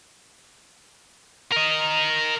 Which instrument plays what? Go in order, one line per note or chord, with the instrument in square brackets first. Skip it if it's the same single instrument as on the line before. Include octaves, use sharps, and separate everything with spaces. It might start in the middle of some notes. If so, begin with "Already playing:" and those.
[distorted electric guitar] A#4 D#5